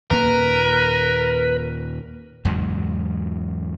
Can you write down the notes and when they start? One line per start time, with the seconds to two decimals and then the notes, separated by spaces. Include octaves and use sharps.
0.11 D#2 A#2 A#3 A#4 B4
2.45 E2 G#2 C#3 F#3